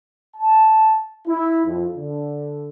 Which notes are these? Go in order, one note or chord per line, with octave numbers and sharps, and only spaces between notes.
A5
E4
F2
D3